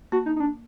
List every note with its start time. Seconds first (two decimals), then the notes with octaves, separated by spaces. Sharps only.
0.12 A#3 F#4
0.26 D#4
0.36 D#4
0.40 D4